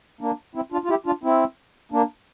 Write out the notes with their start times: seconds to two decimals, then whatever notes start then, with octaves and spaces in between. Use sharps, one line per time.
0.21 A#3 D4
0.55 C4 E4
0.72 D4 F4
0.84 F4
0.89 E4 G4
1.06 D4 F4
1.24 C4 E4
1.92 A#3 D4